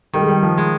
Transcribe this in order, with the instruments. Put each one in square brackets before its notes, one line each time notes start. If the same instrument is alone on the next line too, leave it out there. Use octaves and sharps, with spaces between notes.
[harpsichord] D#3 [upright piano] G3
[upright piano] G#3
G3
F3
[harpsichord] G#3